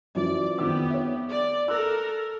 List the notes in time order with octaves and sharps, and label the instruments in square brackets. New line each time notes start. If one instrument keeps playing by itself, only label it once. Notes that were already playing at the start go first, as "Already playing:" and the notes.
[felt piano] F#2 E3 F3 [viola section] D5
[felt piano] F2 D#3 D6 [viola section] B3 G4
[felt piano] C#5 E5
[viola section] D5
[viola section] A4 A#4 [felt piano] E6 F#6